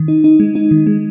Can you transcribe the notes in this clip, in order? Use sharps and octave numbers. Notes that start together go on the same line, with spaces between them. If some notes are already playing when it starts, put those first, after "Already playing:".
Already playing: D#3
D#4
D#4
G#3
D#4
D#3
G#3